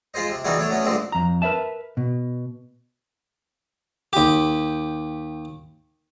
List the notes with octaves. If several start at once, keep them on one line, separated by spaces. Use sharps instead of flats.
G#3 F4 G#4 C5 D#5
C3
B2 E3 G3 D#4 F#4 G#4
A3 D4 C#5
F#3 A3 B3 C#4
D2 G2 A#2 D3 G#3 C4
F2 A#5
A#4 B4 D5 E5 A5
B2
D#2 G4